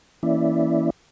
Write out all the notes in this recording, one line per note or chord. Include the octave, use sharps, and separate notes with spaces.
E3 A#3 C#4 E4 D5 E5